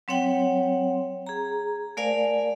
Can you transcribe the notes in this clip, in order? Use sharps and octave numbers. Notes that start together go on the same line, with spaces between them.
F#3 C4 C#5 F#5 G5
G#4 A#5
A3 A#4 C5 D5 F5 G#5